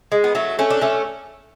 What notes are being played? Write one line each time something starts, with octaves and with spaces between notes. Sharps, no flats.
G#3
B3
F#3 A3
A3 C#4
D4
A3 C#4